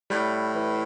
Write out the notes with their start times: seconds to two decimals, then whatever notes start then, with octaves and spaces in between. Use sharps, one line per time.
0.10 A2 G3
0.54 E3